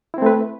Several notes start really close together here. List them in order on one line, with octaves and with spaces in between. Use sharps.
E4 C4 A3 B4